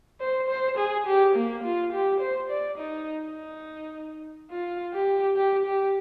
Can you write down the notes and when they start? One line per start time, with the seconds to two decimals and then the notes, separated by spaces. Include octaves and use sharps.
0.21 C5
0.48 C5
0.77 G#4
1.06 G4
1.36 A#3
1.64 F4
1.93 G4
2.20 C5
2.50 D5
2.78 D#4
3.22 D#4
4.51 F4
4.93 G4
5.36 G4
5.66 G4